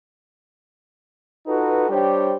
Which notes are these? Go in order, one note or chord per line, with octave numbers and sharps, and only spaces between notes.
D#4 F4 F#4 A4 B4
G3 D4 G4 C5 C#5 G5